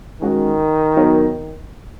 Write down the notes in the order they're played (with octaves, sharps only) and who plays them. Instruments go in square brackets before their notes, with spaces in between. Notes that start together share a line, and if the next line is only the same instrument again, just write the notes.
[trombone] D#3 [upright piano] G#3 C#4 F#4
[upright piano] F#3 B3 D#4 A#4 C#5